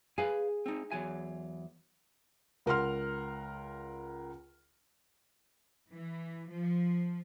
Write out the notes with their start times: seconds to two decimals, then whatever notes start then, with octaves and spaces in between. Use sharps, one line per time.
0.18 G#4 B4 F5 G#5
0.66 C4 D#4
0.91 E2 F#3 G#5
2.66 C#2 A#4 F#5 C6 F6
5.92 E3
6.52 F3